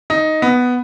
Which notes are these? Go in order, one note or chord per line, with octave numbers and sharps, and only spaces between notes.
D#4
B3